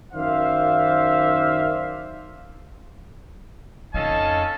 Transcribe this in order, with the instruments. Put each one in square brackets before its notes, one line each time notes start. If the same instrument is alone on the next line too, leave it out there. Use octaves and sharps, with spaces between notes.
[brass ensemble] F#2 D#3 C5 D5 E5 F5
[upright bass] F2 D#4 [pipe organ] C#4 A4 [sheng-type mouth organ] D#5 F5 G#5 [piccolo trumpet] A5